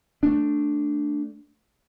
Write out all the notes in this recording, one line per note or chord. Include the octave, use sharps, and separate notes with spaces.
A3 D4